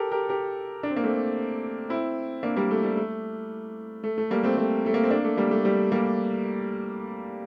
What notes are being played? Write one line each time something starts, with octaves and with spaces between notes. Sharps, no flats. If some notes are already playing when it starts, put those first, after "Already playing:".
Already playing: G4 A4 A#4
G4 A#4
G4 A#4
D4
C4
A#3
A3 C4
C4 E4
A#3 D4
G3 A#3
A3
G3
A3
A3
A3
G3 A#3
A3 C4
A3 C4
A3
A#3
C4
A#3 D4
A3
G3 A#3
A3
G3
G3 A#3